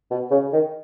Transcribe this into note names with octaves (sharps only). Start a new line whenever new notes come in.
B2
C#3
D#3